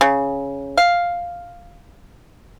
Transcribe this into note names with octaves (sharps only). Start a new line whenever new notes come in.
C#3
F5